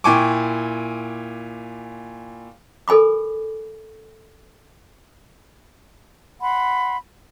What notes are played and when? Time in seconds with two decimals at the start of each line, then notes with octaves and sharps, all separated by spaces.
0.04 A#2 E4 G5 G#5 C#6 D6
2.88 A4 A#4 G#5 B5 D6
6.41 F#5 B5 C6